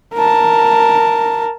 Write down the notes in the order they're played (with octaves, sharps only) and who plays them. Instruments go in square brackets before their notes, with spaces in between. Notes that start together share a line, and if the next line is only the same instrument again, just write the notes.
[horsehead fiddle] A#4 A5